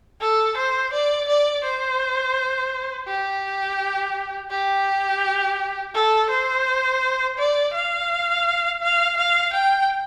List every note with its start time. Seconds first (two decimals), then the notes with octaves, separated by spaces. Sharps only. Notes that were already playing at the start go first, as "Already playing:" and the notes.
0.21 A4
0.57 C5
0.92 D5
1.28 D5
1.64 C5
3.07 G4
4.50 G4
5.95 A4
6.30 C5
7.38 D5
7.73 F5
8.81 F5
9.17 F5
9.53 G5